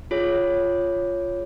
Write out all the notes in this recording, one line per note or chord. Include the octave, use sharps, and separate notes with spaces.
F4 G#4 C#5